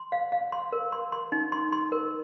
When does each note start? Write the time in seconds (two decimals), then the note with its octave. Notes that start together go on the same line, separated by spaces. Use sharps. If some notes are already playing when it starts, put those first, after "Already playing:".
Already playing: C6
0.12 F5
0.32 F5
0.52 C6
0.72 A#4
0.92 C6
1.12 C6
1.32 D#4
1.52 C6
1.72 C6
1.92 A#4